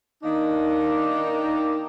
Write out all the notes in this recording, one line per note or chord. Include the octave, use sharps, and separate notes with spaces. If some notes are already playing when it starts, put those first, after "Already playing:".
D#3 A#3 D4 D#4